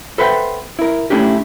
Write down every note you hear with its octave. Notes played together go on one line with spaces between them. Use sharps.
A4 B4 C5 E5 F#5 G5
E4 A#4
A3 C#4 D4 E4 G4